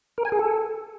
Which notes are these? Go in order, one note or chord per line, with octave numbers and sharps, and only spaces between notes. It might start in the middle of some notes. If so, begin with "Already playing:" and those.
A#4
G#5
G#4
A4